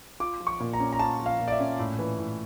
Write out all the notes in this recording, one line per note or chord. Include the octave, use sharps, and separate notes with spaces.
F4 D6
F3
C#6
A#2
A#5
C#4
A#5
F4 A5
F3
F5
A#2
D5
E5
C#4
A2
E3
A2